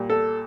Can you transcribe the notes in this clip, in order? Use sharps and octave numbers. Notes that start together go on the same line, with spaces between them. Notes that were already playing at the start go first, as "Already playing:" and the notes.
Already playing: A#2 G3
A4